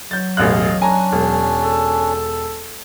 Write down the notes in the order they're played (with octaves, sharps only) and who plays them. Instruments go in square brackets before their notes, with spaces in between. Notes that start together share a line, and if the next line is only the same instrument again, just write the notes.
[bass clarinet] F#3 [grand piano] G6 A6
[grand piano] E1 A1 F#6 [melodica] D#5 F5
[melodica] C#4 D4 [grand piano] G#5 A#5
[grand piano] E1
[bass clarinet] A4